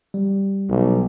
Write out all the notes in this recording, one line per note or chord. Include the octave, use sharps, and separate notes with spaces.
G3
B1